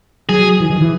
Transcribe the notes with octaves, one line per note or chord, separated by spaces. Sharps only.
F#3 G#4
E3
D#3
E3